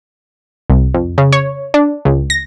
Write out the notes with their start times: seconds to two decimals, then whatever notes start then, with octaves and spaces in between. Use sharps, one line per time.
0.70 C2
0.94 F2
1.18 C#3
1.33 C#5
1.74 D4
2.05 C#2
2.30 A#6